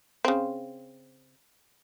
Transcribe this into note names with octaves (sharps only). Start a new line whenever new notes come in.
C#3 C4